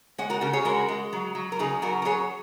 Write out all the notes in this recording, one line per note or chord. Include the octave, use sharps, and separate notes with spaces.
G#3 C#5 F#5
F#4 A#4
C#3 F#4 A#4
G#4 C#5
G#3 F#4 A#4
G#3
F#3
F#3
A#4
C#3 D#4 G#4
F#3 F#4 A#4
A#4
F#3 G#4 C#5